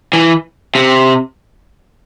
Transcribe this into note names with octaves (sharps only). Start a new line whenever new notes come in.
E3
C3